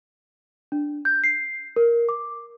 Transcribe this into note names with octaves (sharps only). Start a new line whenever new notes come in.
D4
G6
C7
A#4
D6